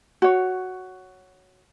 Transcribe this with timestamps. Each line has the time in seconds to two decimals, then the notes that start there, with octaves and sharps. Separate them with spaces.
0.22 F#4 C#5